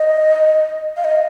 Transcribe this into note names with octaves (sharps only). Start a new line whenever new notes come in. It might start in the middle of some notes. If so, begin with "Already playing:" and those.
Already playing: D#5
F5
D#5